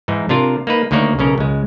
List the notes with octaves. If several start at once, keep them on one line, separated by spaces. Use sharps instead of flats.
G#2 E3 D#4
C3 D4 F4 A#4
A#3 D#4 B4
D2 D#3 A#3 D#4 C#5 D5
B1 C#3 C#4 A#4
C#2 G#3